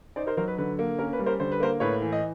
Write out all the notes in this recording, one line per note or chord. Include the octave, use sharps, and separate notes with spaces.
D#4 C5 D5
A#4 C5
F#3 A#4 C5
B4
D3 B4
A#3
C#4 A#4
B4
G3
A#4 C5
D3 C5
B4
A#3 A#4 C5
A2 B4 C#5
E3
D#5